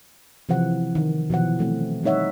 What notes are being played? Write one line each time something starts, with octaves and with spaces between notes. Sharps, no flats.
C3 E3 F3 F#5
D#3
B2 E3 F3 F#5
F#3 A3 C4
G3 C4 D#4 C#5 E5 F#5